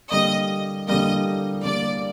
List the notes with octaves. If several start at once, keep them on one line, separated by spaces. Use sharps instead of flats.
D3 G3 A#3 D#5
D3 G3 A#3 D#5
D3 G3 A#3 D5